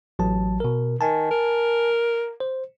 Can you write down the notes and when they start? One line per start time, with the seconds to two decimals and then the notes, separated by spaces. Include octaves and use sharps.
0.19 A1 F#3 A5
0.60 B2 A#4
1.01 D#3 G#5 A5
1.31 A#4
2.40 C5